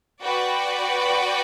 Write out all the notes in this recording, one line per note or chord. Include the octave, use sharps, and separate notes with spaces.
F#4 B4 D5 G5